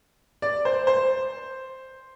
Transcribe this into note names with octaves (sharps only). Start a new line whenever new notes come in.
D5
C5
C5